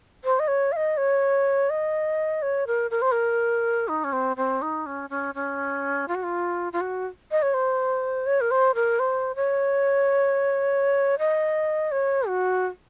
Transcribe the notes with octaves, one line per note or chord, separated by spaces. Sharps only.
C5
D#5
C#5
F5
D#5
C#5
D#5
C#5
A#4
A#4
C5
A#4
D#4
C#4
C4
C4
D#4
C#4
C#4
C#4
F4
F#4
F4
F4
F#4
D#5
C#5
C5
C#5
A#4
C5
A#4
C5
C#5
D#5
C#5
F#4